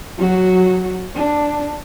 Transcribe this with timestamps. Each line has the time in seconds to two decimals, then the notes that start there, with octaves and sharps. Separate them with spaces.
0.18 F#3 F#4
1.15 D4